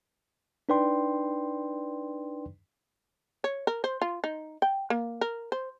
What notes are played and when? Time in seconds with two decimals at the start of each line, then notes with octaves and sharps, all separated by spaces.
0.69 D4 D#4 B4 D5 G5 C6
3.44 C#5
3.67 A#4
3.84 C5
4.02 F4
4.24 D#4
4.62 G5
4.90 A#3
5.21 A#4
5.52 C5